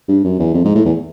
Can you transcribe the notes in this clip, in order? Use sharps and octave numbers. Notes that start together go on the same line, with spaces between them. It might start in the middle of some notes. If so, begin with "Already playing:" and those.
G2
F#2
E2
F2
G#2
A2
E2